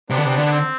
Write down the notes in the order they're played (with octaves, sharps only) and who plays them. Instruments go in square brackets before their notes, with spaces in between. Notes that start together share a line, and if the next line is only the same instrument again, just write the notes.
[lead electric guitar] C3 [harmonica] B3 D4
[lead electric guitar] D3
C3
D3
[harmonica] B3
C4